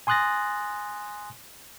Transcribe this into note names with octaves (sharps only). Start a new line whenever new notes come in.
G#5 C6 D#6 F#6 A6 A#6